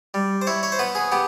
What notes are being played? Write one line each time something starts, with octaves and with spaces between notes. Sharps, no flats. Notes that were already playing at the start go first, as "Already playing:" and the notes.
G3
C5
E4 C#5
C#5
C5
B3 B4
G#4
B3 G4